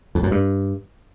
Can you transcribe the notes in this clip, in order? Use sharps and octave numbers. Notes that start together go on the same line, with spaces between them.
F2
F#2
G2